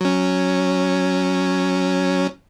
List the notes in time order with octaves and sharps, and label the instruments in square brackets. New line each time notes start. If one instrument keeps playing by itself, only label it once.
[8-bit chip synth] F#3 C#4